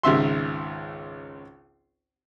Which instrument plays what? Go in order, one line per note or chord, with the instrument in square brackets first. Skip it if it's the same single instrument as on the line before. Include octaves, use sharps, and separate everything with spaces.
[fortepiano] G#1 C#2 E5 C6